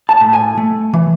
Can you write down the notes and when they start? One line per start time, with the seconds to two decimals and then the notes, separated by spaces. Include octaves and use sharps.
0.09 A5
0.21 A2
0.33 G#5
0.57 A3
0.94 E3